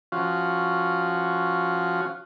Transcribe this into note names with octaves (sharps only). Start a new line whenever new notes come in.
F3 C#4 F4 F#4